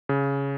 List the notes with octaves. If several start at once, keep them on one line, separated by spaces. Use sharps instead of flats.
C#3